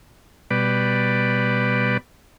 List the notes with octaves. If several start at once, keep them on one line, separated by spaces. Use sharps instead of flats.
B2 G3 B4 D5